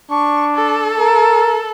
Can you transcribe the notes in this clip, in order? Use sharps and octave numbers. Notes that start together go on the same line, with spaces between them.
D4 C#6
A4
A#4